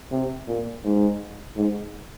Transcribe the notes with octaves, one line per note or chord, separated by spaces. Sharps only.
C3
A#2
G#2
G#2